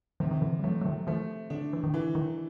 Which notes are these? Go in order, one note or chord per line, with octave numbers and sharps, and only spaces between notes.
C3 D#3 F3
D#3
D3 E3
G3
E3 F#3 A3
F#3
D#3 F3
D#3 F3 A3
D3 D4
E3
D#3
D3 E3
D#3